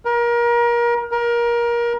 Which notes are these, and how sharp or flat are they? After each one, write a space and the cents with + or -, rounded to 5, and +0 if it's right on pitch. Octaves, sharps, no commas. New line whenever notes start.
A#4 +30
A#4 +25